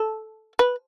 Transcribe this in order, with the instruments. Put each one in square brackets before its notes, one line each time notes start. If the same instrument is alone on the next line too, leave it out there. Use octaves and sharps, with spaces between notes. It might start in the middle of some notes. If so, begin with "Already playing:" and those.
Already playing: [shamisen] A4
B4